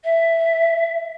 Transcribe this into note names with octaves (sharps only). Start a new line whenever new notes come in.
E5